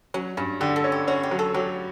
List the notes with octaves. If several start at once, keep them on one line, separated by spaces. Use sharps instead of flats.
F#3 C#4
G2 C#4
D3 G4
A4
C#4
G4
C#4 F#4
G4
F#3
A4
F#3 G4